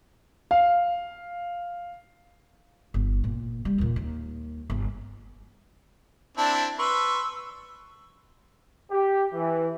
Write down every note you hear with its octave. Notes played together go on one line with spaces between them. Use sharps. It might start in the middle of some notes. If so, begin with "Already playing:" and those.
F5
G1
A#2
G3
D#2 A#2
D#2
G1
C4 D4 E4 A5
B4 C6 C#6 E6
G4
E3